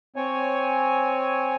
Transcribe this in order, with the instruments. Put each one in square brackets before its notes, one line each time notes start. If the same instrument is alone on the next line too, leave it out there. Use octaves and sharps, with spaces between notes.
[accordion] C4 C#5 G#5